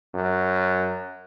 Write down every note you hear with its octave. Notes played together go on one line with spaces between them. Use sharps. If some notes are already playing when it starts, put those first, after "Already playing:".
F#2